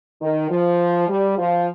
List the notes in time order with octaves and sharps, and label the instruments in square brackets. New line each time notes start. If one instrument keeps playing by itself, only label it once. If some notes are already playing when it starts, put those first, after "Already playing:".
[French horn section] D#3
F3
G3
F3